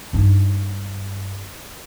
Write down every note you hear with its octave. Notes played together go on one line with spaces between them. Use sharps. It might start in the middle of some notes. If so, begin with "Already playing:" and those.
G2 D#4